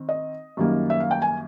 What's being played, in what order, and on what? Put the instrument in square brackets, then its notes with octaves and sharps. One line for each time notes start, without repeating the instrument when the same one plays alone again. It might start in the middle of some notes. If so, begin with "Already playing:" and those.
Already playing: [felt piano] D#3 C4
D#5
F#2 D#3 G3 A#3
E5
F5
G5
G#5